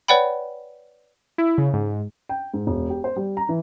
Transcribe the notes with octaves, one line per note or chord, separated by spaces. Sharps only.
B4 C#5 D5 F#5 G5 B5
E4
C#3
G#2
G5
G#2
E1
G4
C5
G3
A#5
E3